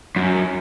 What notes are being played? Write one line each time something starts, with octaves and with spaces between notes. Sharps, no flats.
F#2